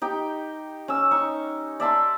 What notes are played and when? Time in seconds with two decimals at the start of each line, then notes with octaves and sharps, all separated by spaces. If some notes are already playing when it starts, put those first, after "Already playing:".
0.02 D#4 G4 G5
0.88 C#4 E6
1.11 D#4 C#6
1.80 D5 E5 A5 C6